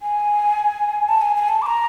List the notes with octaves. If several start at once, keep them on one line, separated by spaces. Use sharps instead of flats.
G#5
A5
G#5
G#5
A5
D6
A#5